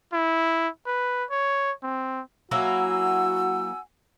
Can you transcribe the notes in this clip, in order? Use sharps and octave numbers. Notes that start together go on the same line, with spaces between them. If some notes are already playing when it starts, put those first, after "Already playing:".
E4
B4
C#5
C4
F#3 A#3 E4 F#4 F#5 G#5 E6